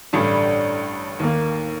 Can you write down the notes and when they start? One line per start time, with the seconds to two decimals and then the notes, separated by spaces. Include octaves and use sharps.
0.13 A1 G2 D3 G3 D4
1.20 D#2 D#3 A#3